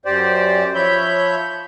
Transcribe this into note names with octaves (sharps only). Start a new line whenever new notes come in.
F#2 G4 C5 D5
F3 C#5 E5 B5 G6